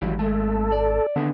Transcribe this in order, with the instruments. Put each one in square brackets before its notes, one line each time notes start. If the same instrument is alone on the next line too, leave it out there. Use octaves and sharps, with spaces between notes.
[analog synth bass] G#1 [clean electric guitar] E3 F#3 G3
[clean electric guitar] G#3 A3 [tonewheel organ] A4
[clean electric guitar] D5
[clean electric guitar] D#2 B3 G#4 [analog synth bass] D3